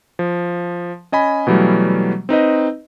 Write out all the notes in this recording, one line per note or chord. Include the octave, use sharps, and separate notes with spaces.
F3
C#4 D#5 G#5 B5
B2 E3 F#3 G3 A3
C4 D#4 B4 D#5